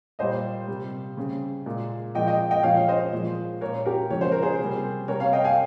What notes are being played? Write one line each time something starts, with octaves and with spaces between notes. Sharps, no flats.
A#2 G3 C5 D#5
C3 G3
C#3 G3
A#2 G#3
A#2 F3 G#3 D#5 G5
D#5 G5
D#5 G5
A#2 F3 G#3 C#5 F5
F5
C5 D#5
A#2 F3 G#3
A#2 G#3 A#4 C#5
G4 A#4
C#3 F3 G#3 C#5
C5
A#4
G#4 C5
C3 G3
C3 G3 A#4 C#5
C#5 F5
D#5 G5
F5 G#5